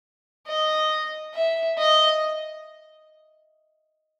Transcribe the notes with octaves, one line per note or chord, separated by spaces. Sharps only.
D#5
E5
D#5